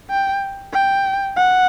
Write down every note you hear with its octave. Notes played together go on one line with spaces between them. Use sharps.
G5
G5
F#5